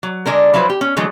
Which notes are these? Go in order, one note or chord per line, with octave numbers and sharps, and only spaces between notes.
F#3
D3 G#3 D4 A#4
F3 F#3 E4 B4 C5
G4
C#4
D3 E3 F#3 G#3 A3